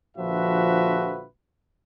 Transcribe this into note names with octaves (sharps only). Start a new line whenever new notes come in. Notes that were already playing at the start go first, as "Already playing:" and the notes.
A#1 D3 F3 F#4 B4 E5